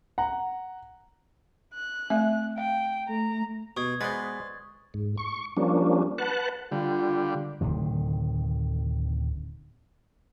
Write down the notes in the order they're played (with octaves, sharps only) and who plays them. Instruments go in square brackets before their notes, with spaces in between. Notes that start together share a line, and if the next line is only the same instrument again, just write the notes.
[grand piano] F#5 A#5
[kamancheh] F#6
[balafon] A3 C4 E5
[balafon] F5 [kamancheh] G5
[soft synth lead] A3 [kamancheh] A#5
[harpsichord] B2 [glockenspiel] C#6 D#6 G#6
[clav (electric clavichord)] G#3 B3 D5 [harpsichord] B4 C5 [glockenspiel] A6
[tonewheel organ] G#2
C#6
F3 G3 A#3 C#4 D4
B4 F#5 A5 F#6
[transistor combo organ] D3 G3 [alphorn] F4
[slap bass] D1 C3 D#3